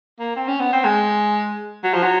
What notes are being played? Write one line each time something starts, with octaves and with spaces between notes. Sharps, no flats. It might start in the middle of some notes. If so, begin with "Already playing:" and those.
A#3
C4
C#4
B3
C4
G#3
F#3
F3
F#3